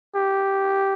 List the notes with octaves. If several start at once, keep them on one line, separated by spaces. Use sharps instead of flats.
G4